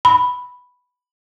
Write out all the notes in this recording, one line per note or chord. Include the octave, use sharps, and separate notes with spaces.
B5